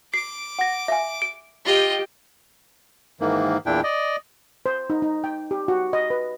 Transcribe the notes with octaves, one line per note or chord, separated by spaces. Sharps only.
D6 C7
F#5 A#6
E5 F5 G#5
D7
F4 G4 D#5 G5
G#2 D#3 E3 A#3
E2 A#2 D4 E4 G5
D5 D#5
C5
D#4
D#4
G5
G4
F#4
D#5
B4